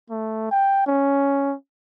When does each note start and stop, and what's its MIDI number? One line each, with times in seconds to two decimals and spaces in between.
0.10 0.49 57
0.51 0.85 79
0.86 1.55 61